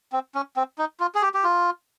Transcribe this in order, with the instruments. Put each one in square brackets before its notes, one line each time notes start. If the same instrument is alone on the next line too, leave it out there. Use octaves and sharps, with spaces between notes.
[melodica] C4
C#4
C4
D#4
F4
G#4
G4
G4
F4